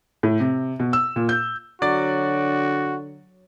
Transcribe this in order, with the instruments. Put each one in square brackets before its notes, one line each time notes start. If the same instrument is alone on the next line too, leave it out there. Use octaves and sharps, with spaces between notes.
[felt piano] A2
C3
B2
E6
A#2
G6
[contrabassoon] D3 [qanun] F#3 [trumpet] F#4 [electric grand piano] D5 A6